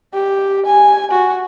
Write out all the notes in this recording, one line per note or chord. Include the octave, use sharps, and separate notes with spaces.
G4
G#5
F#4